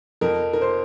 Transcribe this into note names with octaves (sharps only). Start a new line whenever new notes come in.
F2 A#4
A#4
C5